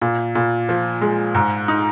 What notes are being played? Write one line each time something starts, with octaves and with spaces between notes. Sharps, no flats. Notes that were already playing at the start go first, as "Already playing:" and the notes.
A#2
A#2
F3
G#3
G#2
D#4